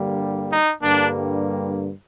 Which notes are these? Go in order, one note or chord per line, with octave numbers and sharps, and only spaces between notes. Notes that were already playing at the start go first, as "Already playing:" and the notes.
Already playing: G2 D3 G3 A#3
D#4
G2 D3 G3 A#3 D4